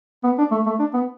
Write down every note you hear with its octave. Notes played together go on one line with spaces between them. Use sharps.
B3
D4
A3
A3
D4
B3